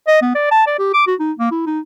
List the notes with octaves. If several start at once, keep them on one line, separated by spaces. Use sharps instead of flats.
D#5
B3
D5
A5
D5
G4
D6
F#4
D#4
A#3
E4
D#4